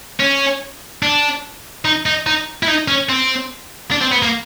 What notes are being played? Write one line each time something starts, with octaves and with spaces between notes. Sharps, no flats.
C#4
D4
D#4
D#4
D#4
E4
D#4
C#4
C4
D4
C4
B3
A#3